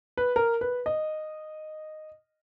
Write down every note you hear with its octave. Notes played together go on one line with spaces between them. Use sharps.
B4
A#4
B4
D#5